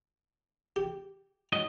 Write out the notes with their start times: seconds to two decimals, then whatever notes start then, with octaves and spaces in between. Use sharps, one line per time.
0.76 G4
1.52 G#2 F#3 D#5